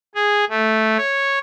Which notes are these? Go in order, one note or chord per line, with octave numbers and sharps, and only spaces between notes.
G#4
A3
C#5